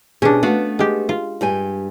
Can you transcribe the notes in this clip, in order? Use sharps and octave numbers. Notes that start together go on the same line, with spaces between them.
B2 C#4 D4 G4 G#4
A3 B3 F#4 F5
G#3 G4
F4
G2 G4 G#5